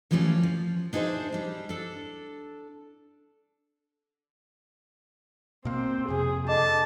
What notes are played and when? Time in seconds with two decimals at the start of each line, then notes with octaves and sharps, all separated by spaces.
0.11 E3 F3 G3 A3 A#3 C#4
0.43 F3
0.93 D4 D#4 G#4 A4 C5 E5
1.32 G3 D4
1.69 D4 A4
5.65 B2 A#3 C4
6.08 F2 C3 G#4
6.48 D3 D#5 A5 D6